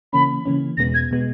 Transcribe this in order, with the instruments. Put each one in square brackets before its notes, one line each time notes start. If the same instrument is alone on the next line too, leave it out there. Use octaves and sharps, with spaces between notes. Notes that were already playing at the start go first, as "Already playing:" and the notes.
[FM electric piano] C#3 E3 A#3 C#4 [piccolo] B5
[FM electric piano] C#3 E3 A#3 C#4
[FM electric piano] E2 B2 G#3 B3 [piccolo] A#6
[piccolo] G#6
[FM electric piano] B2 G#3 B3